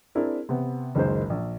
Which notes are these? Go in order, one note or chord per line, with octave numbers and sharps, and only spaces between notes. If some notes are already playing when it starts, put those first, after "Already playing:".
C4 D4 E4 G#4 A#4
C3 B3
F#1 C#2 D#3 G#3 C5
A#1